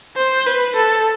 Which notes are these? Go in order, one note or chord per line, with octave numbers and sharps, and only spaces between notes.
C5
B4
A4